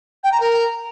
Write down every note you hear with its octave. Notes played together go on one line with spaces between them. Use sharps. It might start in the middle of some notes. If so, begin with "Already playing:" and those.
G5
A#5
A#4